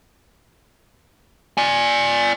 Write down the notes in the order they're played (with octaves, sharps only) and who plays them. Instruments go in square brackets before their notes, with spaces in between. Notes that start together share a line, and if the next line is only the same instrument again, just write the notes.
[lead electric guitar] D5 G#5